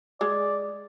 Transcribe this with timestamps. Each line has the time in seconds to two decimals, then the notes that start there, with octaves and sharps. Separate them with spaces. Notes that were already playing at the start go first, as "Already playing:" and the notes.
0.21 G#3 D5